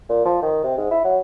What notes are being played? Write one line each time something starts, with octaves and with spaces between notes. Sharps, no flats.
A#2
F3
D#3
C3
G#2
E4
F#3